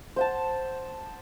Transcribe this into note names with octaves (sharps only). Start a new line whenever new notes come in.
C5 F#5 A5